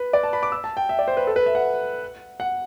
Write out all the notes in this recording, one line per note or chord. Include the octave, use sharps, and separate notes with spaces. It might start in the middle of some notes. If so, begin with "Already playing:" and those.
Already playing: B4
D5
A5
B5
D6
E6
A5
G5
E5
D5
C5
B4
A4
B4
E5
F#5
F#5